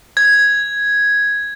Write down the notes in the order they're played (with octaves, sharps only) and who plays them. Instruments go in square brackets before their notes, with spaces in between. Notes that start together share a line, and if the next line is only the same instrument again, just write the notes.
[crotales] G#6